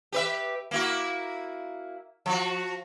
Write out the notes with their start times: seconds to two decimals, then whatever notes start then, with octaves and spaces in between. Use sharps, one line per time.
0.12 G4 B4 E5
0.71 A#3 E4 F#4
2.26 F3 F#4